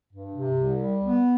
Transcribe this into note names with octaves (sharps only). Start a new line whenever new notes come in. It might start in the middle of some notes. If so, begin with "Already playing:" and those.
G2
C3
C2
G3
B3